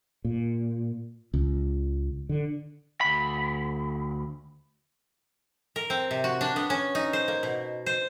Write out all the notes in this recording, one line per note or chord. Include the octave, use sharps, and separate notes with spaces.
A#2
C#2
D3
D2 B5
A#4
C4
C3
F#4
D4
B3
C#4
D#4
C5
A#3
B2
C5